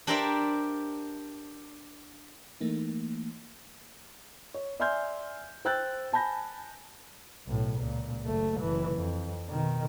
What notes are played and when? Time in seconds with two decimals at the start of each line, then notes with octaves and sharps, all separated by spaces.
0.07 D4 G4 A#4 C5 D5 E5
2.61 E3 A3 A#3 D#4
4.54 C#5
4.80 D5 E5 G#5 C6 F6 G6
5.65 C5 G5 E6 F#6 G6 A6
6.13 G#5 A5 B5 G6 A#6
7.47 B1 A2
7.79 C#2 A#2
8.26 F#1 A3
8.61 F#1 E3
8.95 F2
9.48 B2 D#3